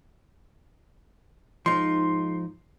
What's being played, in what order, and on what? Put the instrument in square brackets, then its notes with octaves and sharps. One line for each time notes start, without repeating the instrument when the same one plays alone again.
[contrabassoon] G#2 [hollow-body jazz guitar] F3 D#4 [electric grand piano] C6